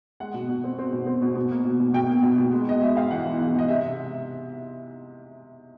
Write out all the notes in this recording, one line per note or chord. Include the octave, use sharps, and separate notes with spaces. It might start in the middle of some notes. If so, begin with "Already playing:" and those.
G#3 F#5
B2
B2
C4
C4
B2
C4
B2
B2
A#3
B2
B2
B2 G5
A#3
B2
B2
G#3
G#3 D#5
G#3 E5
G#2 F5
E3 F#5
E3
G#2
G#2
D#5
C3 E5